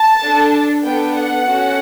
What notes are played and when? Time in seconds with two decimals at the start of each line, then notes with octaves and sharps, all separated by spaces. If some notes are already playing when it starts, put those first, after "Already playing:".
Already playing: A5
0.22 D4 A4
0.84 B3 D4 A4 G5
1.15 F#5
1.45 C#4 F#4 A4